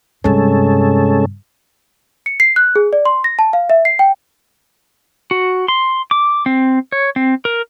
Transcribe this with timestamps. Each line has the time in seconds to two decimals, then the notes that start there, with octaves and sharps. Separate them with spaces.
0.24 G2 C3 G#3 C#4 A4
2.26 C#7
2.40 C7
2.56 F#6
2.76 G#4
2.93 D5
3.05 C6
3.24 A#6
3.39 A5
3.53 F5
3.70 E5
3.85 C7
3.99 G5
5.31 F#4
5.68 C6
6.11 D6
6.46 C4
6.92 C#5
7.16 C4
7.45 A#4